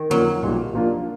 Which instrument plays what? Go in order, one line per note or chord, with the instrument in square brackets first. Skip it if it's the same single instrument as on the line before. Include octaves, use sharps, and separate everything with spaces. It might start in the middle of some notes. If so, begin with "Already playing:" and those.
Already playing: [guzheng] D#3
[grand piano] F2 D3 F3 A#3 C#4 [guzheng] F#3
[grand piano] B1 A#2 G3
A#2 F3 A#3 D4 F4